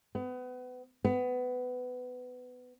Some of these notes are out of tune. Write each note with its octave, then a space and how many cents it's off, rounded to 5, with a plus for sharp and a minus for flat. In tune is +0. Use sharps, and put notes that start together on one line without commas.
B3 +30
B3 +20